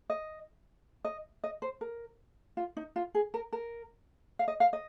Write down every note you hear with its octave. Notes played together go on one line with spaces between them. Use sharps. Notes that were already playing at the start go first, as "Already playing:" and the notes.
D#5
D#5
D#5
C5
A#4
F4
D#4
F4
G#4
A#4
A#4
F5
D#5
F5
D#5